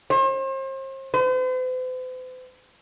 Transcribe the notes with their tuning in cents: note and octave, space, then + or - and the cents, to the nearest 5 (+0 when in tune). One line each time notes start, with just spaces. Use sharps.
C5 +40
C5 -45